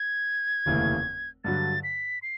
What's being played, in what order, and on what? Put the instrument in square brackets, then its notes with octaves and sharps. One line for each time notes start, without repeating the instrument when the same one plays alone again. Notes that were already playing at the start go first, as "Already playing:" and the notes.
Already playing: [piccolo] G#6
[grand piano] F1 D#2 C#3 E3 A3
[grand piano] G2 D3 F#3 [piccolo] A6
[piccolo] B6
C7